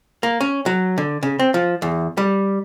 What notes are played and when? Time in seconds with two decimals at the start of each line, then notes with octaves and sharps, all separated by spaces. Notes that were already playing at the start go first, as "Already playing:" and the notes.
0.23 A#3
0.41 C#4
0.66 F#3
0.98 D3
1.23 C#3
1.39 C4
1.54 F3
1.82 E2
2.17 G3